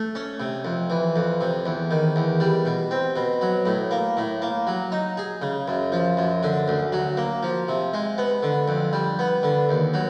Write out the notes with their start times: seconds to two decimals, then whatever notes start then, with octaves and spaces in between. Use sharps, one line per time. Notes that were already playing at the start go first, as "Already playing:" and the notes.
Already playing: A3
0.15 C#4
0.40 C3
0.65 F2
0.90 E3
1.16 F2
1.41 C3
1.66 E2
1.91 D#3
2.16 E2
2.40 G3
2.65 B2
2.91 C4
3.16 B2
3.41 F#3
3.66 A2
3.91 A#3
4.17 A2
4.42 A#3
4.67 F#3
4.92 D#4
5.17 G#4
5.42 C#3
5.68 F#2
5.92 F3
6.17 F#2
6.43 D3
6.68 D2
6.93 F#3
7.17 A#3
7.43 F3
7.68 C3
7.94 G#3
8.18 B3
8.43 D3
8.68 F2
8.93 G3
9.19 B3
9.43 D3
9.69 D#2
9.94 F#3